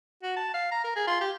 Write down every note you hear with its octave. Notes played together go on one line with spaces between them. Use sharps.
F#4
A5
F5
A#5
A#4
G#4
F4
G4